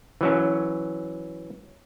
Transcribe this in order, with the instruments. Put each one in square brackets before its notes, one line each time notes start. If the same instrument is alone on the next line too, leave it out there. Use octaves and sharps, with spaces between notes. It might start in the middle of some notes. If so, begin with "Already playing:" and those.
[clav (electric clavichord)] E3 F#3 C#4